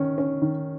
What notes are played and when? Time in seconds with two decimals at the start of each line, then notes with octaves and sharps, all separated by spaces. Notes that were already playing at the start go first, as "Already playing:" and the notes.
Already playing: D#3 C#4
0.18 C#4
0.42 D#3